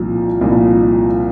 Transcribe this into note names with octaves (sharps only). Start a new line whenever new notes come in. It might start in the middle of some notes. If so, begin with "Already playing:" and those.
Already playing: C2 A#2 F3
C2 A#2 F3